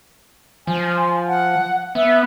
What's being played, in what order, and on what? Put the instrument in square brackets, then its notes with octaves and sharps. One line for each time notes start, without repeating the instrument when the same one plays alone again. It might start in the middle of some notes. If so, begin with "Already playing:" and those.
[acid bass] F3 [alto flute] G#5
[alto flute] F#5
[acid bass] B3 [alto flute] E5